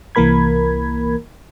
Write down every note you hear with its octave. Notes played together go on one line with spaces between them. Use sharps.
C2 E3 A#3 A#4 B5 G#6